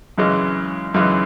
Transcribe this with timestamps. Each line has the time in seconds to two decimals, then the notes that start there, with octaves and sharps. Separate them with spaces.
0.18 F#2 C#3 E3 G#3
0.94 F#2 C#3 E3 G#3